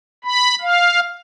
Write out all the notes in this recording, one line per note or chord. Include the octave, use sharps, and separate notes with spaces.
B5
F5